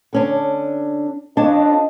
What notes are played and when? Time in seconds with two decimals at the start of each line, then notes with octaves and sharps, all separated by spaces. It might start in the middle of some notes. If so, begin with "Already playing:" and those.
0.13 D3 C#4 D4
1.37 F2 C#4 D4 D#5 A5